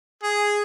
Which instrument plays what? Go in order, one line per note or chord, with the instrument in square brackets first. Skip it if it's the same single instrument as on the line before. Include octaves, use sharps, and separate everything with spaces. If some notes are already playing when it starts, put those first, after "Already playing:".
[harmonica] G#4